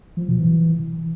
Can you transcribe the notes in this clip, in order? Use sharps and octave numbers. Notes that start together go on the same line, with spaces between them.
F3
B2
E3